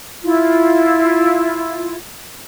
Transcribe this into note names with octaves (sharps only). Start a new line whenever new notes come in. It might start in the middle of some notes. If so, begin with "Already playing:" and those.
E4 F4